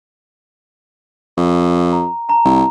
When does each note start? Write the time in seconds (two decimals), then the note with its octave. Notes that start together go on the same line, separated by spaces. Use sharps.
1.38 F2
1.93 A#5
2.29 A5 A#5
2.45 C2